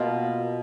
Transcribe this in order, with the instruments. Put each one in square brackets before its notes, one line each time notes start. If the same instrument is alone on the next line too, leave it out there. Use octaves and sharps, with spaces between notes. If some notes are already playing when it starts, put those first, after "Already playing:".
Already playing: [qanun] B2 A#3 F4